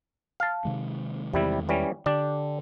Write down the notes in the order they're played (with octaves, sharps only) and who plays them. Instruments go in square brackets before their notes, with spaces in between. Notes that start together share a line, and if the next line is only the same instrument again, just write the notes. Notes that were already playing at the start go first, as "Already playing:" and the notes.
[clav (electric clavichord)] F5 A5
[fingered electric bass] C3 D#3 G#3
[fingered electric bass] E2 D#3 G#3 [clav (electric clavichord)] C3 G3 E4
[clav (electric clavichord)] E3 G3 C#4
[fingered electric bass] D3 [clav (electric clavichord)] D4 G4 D5